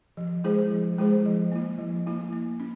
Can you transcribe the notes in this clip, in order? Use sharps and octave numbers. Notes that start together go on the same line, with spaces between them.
F3
G#3 E4 G#4 C5
F3
G#3 E4 G#4 C5
F3
A#3 E4
F3
A#3 E4
A#3
C#4